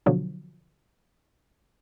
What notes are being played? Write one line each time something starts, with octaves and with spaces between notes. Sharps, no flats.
B2 D3 F3 F#3